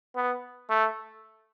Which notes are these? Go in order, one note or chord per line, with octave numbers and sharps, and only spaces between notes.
B3
A3